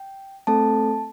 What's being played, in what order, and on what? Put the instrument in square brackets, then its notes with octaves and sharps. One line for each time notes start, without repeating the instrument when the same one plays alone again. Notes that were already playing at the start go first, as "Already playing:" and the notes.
Already playing: [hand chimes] G5
A3 C4 A4 A5